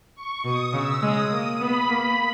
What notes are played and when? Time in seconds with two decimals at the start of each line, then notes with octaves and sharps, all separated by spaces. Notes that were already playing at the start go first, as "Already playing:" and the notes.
0.15 C#6
0.44 B2 D#6
0.73 C#3 E6
1.02 G#3 D#6
1.31 A#3 D#6
1.60 B3 B5
1.89 A#3